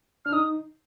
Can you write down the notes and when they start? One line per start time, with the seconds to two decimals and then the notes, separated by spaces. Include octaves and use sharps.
0.25 D4 F6
0.33 D#4 D#6